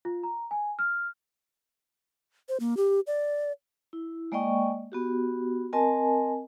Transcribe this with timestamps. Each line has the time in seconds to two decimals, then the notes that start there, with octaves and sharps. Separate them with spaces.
0.05 F4
0.23 A#5
0.51 G#5
0.79 F6
2.49 C5
2.60 A#3
2.77 G4
3.07 D5
3.93 E4
4.32 G#3 A#3 D5 D#5 G5 C#6
4.92 B3 F#4 G4
5.73 C4 A#4 D#5 G#5 A5